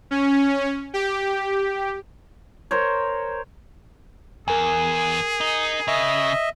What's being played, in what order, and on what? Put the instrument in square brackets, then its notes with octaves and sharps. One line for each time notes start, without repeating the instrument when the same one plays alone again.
[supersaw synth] C#4
G4
[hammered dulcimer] A#4 C5 C#5
[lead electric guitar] E2 [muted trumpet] G#4 [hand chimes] A#4 G#5
[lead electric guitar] D#4
[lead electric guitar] C#3 [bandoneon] D#5 E5